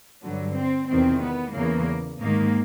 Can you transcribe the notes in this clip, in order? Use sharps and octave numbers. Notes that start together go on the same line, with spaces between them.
G2 D3 F#3
C4
E2 C3 D#3 C4
B3
E2 C#3 E3 A#3
G#2 D#3 A#3